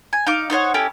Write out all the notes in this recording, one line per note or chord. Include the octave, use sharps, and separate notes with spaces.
G#5
D#4 F5 D6
D#4 C5 C#5 F#5
C#4 E4 G4 A4